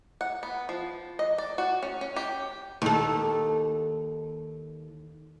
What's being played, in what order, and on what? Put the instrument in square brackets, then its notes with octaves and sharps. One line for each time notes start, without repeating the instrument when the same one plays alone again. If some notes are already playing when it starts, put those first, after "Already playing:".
[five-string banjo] F#5
B3
F3
D#5
D5
F#4
C#4
C#4
G4
[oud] D#2 A4